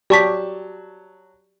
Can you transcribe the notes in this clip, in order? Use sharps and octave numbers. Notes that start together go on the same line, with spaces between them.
F#3 G4 D5 A5 C#6 B6